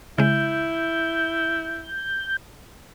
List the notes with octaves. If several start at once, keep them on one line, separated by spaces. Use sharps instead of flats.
C#3 G#3 E4 G6